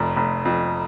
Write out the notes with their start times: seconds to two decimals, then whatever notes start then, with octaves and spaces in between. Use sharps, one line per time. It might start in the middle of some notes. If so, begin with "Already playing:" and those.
Already playing: F1 F2
0.17 F1
0.45 F2